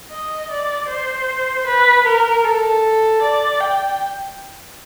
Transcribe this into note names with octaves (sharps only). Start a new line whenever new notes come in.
D#5
D5
C5
B4
A#4
A4
D5
G5